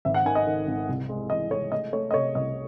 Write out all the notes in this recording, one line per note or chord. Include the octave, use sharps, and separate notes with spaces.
G#1 E5
F#5
D#3 G#5
D#5
D#3
G#1
C2
G#3
E3 D#5
G#3 C#5
A3 D#5
A3 C#5
D#5
C3 C#5
C2 D#5